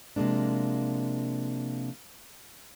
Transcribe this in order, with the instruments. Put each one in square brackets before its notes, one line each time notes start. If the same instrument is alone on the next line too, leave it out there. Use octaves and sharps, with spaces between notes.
[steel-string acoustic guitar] C3 F3 G#3 A#3 D4